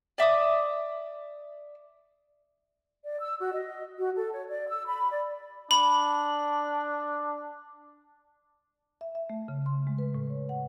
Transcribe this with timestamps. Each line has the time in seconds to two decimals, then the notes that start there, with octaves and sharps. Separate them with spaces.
0.18 D5 E5 D6 D#6
3.04 D5
3.21 E6
3.39 F#4
3.52 D#5
3.98 F#4
4.15 A4
4.32 C#5
4.49 D5
4.68 E6
4.86 B5
5.11 D5
5.71 D4 B5
9.01 E5
9.15 E5
9.30 A3
9.48 C#3
9.66 C6
9.87 G#3
9.98 B4
10.15 A2
10.30 C#5
10.49 F#5